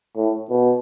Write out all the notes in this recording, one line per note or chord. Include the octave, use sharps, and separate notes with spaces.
A2
B2